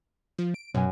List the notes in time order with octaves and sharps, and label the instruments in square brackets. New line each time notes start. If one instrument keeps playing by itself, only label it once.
[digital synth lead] F3
D7
[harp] F#2 G#5 [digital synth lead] B2